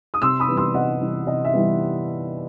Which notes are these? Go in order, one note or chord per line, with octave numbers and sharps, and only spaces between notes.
D#6
C3 C6 E6
B5 D#6
E3 G3 B3
C6 E6
C3 D#5 F#5
E3 G3 B3
C3 D#5
E5
E3 G3 B3